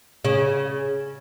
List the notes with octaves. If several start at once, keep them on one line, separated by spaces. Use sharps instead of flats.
C#3